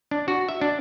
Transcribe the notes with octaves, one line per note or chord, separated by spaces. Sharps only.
D4
F#4
E5
D4